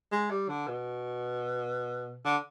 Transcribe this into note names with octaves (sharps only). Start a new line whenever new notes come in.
G#3
G3
D3
B2
D3